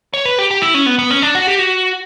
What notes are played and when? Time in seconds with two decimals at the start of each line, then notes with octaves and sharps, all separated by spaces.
0.14 C#5
0.25 B4
0.38 G4
0.51 G4
0.62 E4
0.74 C#4
0.86 B3
0.99 B3
1.11 C#4
1.22 D4
1.35 F#4
1.47 G4
1.59 F#4